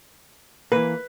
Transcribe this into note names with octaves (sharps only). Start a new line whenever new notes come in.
E3 A#3 B4